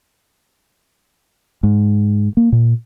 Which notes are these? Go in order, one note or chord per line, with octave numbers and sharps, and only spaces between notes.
G#2
A#3
A#2